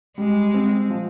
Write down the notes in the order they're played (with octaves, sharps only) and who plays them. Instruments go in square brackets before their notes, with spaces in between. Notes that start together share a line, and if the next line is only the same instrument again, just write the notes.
[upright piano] G3 [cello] G#3
[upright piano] C4
F3